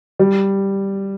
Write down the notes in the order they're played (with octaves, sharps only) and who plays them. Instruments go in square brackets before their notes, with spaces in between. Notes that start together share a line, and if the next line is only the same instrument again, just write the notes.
[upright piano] G3